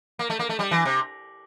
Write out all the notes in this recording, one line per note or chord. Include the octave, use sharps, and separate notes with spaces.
A#3
A3
A#3
A3
G3
E3
C3